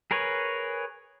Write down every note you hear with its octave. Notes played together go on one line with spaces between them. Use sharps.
G#4 A#4 B4 C#5